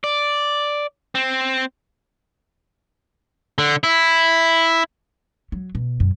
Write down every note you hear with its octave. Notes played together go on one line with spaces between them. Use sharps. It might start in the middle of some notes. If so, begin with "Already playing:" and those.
D5
C4
D3
E4
F#3
B2
F#2